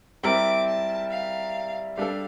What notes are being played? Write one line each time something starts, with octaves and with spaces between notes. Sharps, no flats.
G3 C4 E4 A#4 D6
A5
F5
G3 D4 A4 F5